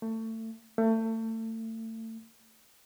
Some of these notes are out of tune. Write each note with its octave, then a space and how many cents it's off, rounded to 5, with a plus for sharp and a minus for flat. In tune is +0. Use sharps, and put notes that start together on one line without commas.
A3 +25
A3 +30